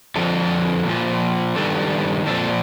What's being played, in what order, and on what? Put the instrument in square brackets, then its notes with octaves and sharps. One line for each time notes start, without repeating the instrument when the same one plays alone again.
[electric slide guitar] F2 D3 F3 A4
A#2 F3
G2 D#3 A4
A#2 F3 A4